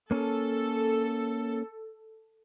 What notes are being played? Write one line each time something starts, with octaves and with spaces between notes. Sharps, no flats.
A#3 C#4 A4